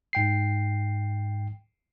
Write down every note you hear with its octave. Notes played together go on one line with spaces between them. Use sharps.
G#2 G5 C7